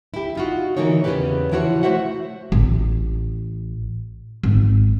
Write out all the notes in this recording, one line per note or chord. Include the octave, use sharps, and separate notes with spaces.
E4 G4
D#4 F4 F#4
D3 E3 A#3 D#4 C#5
E2 C#3 F3 B3 G4 B4
E3 F3 E4 F#4 C5 C#5
A3 F#4 C5 E5 F#5
A1
G#1